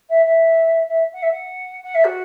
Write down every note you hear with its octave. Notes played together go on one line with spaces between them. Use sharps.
E5
E5
E5
F#5
E5
F#5
F#5
E5
F#4